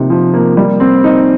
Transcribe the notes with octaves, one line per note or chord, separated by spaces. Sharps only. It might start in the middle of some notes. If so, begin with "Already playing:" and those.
Already playing: C3 F3 A#3 D#4
F3
A#3
G3
C4
D#4